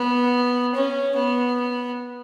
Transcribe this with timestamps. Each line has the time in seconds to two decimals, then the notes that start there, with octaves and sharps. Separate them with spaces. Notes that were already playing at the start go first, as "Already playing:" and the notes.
Already playing: B3
0.75 C#4
1.16 B3